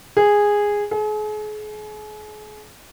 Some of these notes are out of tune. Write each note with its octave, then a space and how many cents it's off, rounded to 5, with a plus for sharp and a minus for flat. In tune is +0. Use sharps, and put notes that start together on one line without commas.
G#4 -10
G#4 +40